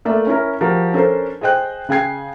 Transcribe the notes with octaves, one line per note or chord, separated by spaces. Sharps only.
A3 A#3 D5 E5
C#4 E4 A#4
F3 F#4 G4 A#4
C#4 D4 A4 A#4 C5
G#4 C5 D#5 G5 F#6
C#3 G#4 G5 G#6 C7